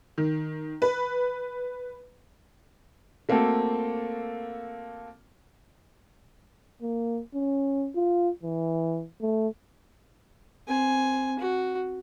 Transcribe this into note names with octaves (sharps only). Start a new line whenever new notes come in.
D#3
B4
A3 A#3 C4 F#4 A4
A#3
C#4
F4
E3
A3
C4 G#5
F#4